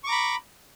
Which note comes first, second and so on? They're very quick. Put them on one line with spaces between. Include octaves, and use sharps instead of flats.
C#6 D6 A#5 B5